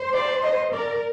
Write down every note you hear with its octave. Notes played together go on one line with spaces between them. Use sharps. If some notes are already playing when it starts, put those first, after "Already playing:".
Already playing: C5
D5
D#5
A#4 D5